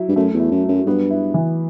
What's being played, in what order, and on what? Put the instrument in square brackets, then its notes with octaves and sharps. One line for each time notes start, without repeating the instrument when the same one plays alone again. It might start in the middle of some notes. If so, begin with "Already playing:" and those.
Already playing: [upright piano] F#3 E4
[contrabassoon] G2
[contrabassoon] F#2 [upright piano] A3
[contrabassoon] E2
[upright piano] E4
[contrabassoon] F#2
[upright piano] F#3
[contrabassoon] F#2
[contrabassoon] G2 [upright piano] B3
[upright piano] E4
E3